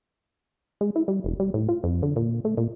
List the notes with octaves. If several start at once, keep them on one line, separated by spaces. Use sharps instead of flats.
G#3
E4
G3
E1
G3
A2
F4
F2
D3
A#2
A3
A#2